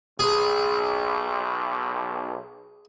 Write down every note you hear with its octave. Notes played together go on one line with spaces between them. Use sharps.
B1 G#4